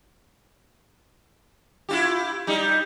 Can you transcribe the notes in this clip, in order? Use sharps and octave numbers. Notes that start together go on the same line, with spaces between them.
E4 F4 G4
G3 D#4